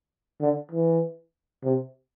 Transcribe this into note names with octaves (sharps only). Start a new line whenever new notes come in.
D3
E3
C3